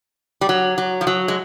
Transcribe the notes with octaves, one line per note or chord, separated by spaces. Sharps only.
G3
F#3
F#3
F3
F#3
G#3